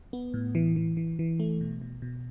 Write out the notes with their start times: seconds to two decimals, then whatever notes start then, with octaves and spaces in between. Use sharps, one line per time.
0.13 B3
0.34 A2
0.55 E3
0.76 E3
0.97 E3
1.19 E3
1.40 A3
1.61 B2
1.81 B2
2.02 B2